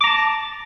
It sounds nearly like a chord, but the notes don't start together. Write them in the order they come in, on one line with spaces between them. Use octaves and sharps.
D6 A#5 A5